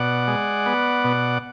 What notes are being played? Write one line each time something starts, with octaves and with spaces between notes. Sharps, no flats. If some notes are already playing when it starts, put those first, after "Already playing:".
Already playing: B2 D5 F#5
G#3
B3
B2